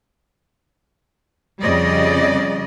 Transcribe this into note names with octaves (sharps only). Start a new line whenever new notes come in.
F2 C#3 G3 D5 D#5